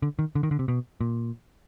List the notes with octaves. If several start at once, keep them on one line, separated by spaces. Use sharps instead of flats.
D3
D#3
D3
D#3
D3
C3
B2
A#2